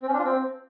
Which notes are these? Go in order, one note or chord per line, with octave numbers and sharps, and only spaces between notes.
C4
C#4
D4
F4
C4